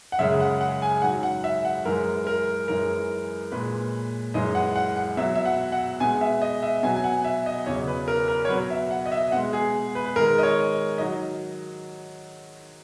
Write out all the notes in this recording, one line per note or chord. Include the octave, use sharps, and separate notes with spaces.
F#5
F#2 C#3 G#3 E5
F#5
F#5
G#5
G#2 F#3 F#5
F#5
E5
F#5
F#2 E3 G#3 A#4
A#4
F#2 E3 G#3 A#4
A#2 G#3 B4
F#2 E3 G#3 D#5
F#5
F#5
F#5
B2 F#3 E5
E5
F#5
F#5
B2 G#3 G#5
E5
D#5
E5
B2 F#3 G#5
G#5
F#5
E5
D#5
E2 C#3 F#3 C#5
B4
A#4
A#4
C#5
B2 F#3 B4
E5
F#5
D#5
E5
B2 G#3 F#5
G#4
B4
B4
G#2 D#3 G#3 A#4
D#5
C#5
D#3 F#3 D#5